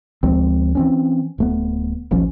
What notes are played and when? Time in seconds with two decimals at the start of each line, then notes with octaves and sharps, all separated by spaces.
0.23 D2 F3 G#3 C4
0.75 E3 C4 C#4
1.38 D1 A3 B3
2.11 D#1 A1 F3 C#4